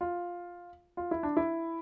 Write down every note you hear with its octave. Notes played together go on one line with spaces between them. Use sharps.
F4
F4
E4
D4
E4